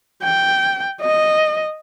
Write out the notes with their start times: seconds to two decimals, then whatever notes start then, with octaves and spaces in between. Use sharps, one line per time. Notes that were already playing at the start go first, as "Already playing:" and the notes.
0.23 G5
1.01 D#5